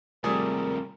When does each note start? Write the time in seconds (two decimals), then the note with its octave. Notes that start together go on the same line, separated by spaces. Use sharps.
0.24 D#2 C3 F3 G3 A3 G#4 A#4